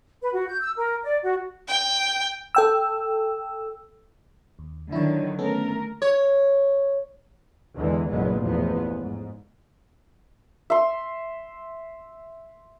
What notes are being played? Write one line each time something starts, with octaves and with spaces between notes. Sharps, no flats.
B4
F#4
G6
E6
A#4
D5
F#4
G5
A4 G5 E6
D#2
D3 D#3 F#3 E4 C#5
A3 B3 C#4 A4 A#4
C#5
E2 D3 E3 G#3
F#1 E2 G2 A#2 G#3 B3
A1 E2 F3 B3
G#2
E5 C6